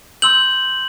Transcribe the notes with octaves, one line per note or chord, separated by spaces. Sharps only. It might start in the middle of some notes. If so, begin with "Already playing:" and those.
C6 E6 G6 F#7